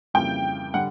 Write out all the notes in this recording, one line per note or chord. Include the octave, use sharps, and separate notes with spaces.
F2 C#3 E3 G3 A#3 G5
D3 G3 F#5